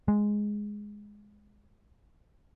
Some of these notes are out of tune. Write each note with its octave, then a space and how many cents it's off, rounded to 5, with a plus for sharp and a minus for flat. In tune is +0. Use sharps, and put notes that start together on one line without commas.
G#3 +0